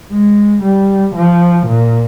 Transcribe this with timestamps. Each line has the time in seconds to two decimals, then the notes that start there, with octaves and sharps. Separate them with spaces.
0.12 G#3
0.63 G3
1.15 F3
1.67 A#2